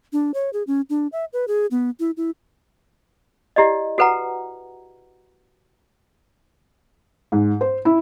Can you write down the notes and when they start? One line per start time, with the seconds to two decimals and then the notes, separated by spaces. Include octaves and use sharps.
0.13 D4
0.34 C#5
0.53 G#4
0.67 C#4
0.90 D4
1.12 E5
1.33 B4
1.48 G#4
1.71 B3
2.00 E4
2.17 E4
3.56 E4 G4 D5 D#5
3.98 F#4 A4 B4 F#5 A#5
7.32 G#2
7.61 C5
7.85 E4